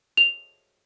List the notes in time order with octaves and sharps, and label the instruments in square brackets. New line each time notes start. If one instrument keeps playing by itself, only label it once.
[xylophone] F7